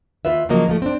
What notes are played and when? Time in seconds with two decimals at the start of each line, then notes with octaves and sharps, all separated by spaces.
0.25 D#2 F4 B4 E5
0.49 C#3 F3 F#3 A#3 D#5
0.67 D#2 F3 A3
0.82 C4 D4